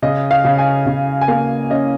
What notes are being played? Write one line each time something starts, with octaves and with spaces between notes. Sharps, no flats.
C#3 D#5
F5
C#3
G#5
C#3
G#5
A#3 F5
C#4 D#5